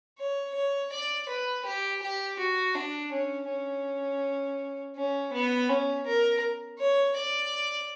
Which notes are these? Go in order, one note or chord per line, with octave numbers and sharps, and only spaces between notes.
C#5
C#5
D5
B4
G4
G4
F#4
D4
C#4
C#4
C#4
B3
C#4
A#4
C#5
D5